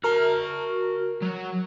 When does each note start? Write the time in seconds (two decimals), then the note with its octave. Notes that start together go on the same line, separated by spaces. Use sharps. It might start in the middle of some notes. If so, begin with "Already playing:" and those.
0.04 F#4 A#4 A5 F6
1.22 F#3